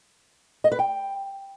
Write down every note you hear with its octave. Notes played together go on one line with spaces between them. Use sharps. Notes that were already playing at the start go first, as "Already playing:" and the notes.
D#5
B4
G5